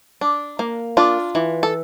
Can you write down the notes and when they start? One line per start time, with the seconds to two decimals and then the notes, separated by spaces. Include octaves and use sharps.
0.21 D4
0.59 A#3
0.97 D4 F4
1.35 E3
1.63 A4